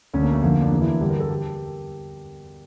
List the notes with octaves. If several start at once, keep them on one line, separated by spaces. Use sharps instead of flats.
D2 D3 C#4
A#3
A3
F2 D3 A#3
D4
E2 E3 A#3
E4
G2 D3 G4
A#4
A4
G4